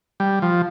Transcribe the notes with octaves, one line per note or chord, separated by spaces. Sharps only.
G3
F3